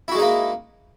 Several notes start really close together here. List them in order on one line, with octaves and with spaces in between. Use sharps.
E4 F#4 G#3 D#4 A#3